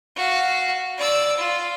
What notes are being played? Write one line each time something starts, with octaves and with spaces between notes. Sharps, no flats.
F#4 F5
D5 E6
F4